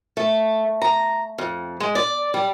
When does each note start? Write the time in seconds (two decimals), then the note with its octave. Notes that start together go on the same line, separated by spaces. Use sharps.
0.17 A3
0.82 A#5
1.38 F2
1.80 G#3
1.95 D5
2.34 G3